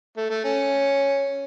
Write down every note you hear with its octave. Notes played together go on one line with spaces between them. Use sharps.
A3
A3
C#4